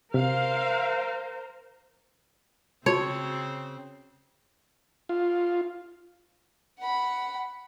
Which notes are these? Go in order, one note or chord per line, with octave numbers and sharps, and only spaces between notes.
C3 A#4 C5 F5
C#3 C4 F#4 C#5 A5
F4
F#5 B5